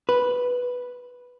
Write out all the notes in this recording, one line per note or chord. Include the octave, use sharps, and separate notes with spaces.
B4